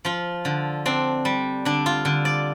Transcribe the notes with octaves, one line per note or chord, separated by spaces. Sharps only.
F3 F4
D3
C4 D4
G3
D3 D4
F4
D3
D5